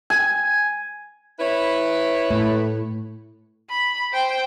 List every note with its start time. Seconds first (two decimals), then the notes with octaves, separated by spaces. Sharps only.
0.10 G#5
1.40 E4 B4 C#5
2.30 A2
3.70 B5
4.13 C5 G5